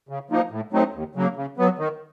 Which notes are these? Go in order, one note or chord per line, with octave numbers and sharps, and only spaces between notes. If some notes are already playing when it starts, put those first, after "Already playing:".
C#3
F3 A#3 D#4
A2
F#3 A3 C4 D#4
D#2
C#3 F#3 A#3
C#3
F#3 B3
D#3